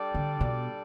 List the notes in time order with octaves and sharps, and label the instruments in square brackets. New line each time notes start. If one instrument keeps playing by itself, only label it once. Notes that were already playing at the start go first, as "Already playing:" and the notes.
Already playing: [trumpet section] G3 D4 A4 D5 G5
[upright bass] D3
B2